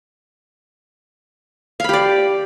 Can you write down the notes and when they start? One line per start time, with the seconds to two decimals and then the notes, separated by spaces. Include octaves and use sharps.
1.80 F5
1.84 B5
1.89 G4
1.93 D5